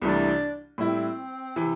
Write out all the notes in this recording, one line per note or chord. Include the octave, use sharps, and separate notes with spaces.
C2 C3 E3 A3 D4
A2 G3 C4 E4
C3 E3